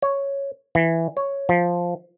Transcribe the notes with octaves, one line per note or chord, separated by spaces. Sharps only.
C#5
E3
C#5
F3